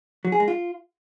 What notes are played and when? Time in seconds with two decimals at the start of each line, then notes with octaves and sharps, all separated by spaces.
0.25 F#3
0.32 G#4
0.40 G#3
0.48 F4